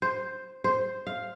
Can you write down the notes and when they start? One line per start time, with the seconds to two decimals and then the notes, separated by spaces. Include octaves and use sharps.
0.02 C5
0.64 C5
1.07 F5